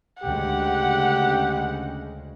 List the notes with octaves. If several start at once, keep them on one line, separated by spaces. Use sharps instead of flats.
D2 C#3 G#3 G4 F#5